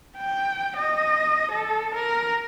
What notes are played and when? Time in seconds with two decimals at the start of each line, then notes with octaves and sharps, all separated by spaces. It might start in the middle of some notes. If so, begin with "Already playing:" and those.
0.17 G5
0.77 D#5
1.52 A4
1.94 A#4